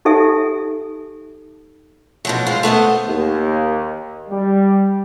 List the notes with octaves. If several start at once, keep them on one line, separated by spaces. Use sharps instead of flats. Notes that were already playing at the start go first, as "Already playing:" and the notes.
D#4 G4 A4 E5 G#5
B2 F3 F#3
G#3 F4 C5 F5
A3 B3 C5 D#5
D#2
G3